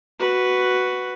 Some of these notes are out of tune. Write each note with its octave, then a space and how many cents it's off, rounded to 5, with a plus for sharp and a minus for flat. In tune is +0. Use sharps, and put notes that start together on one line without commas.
F#4 +0 B4 +0